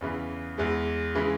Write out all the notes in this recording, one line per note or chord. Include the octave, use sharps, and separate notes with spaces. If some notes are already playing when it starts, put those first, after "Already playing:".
E2 C#3 E3
E2 E3 G#3
C#3 E3 G#3